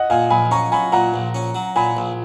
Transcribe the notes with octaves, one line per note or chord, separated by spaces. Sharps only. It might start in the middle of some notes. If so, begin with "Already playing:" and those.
Already playing: D#5 F#5
A#2 F5 G#5
A#1 G#5 B5
C#4 A#5 C#6
F#3 G#5 B5
A#2 F#5 A#5
A#1
C#4
F#3
A#2 G#5 B5
A#1